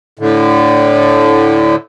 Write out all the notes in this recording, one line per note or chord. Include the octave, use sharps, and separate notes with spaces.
A2 D3